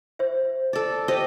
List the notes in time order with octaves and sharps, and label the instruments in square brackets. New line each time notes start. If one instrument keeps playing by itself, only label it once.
[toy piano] C5 E5
[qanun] A4 D5
[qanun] G4 D#5 [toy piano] C5